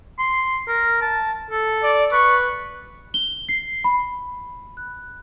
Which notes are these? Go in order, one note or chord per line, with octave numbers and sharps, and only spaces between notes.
C6
A#4
A5
A4
D5
B4 C#6
G7
C7
B5
F#6